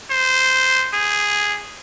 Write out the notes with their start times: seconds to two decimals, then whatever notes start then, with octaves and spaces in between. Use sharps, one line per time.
0.10 C5
0.93 G#4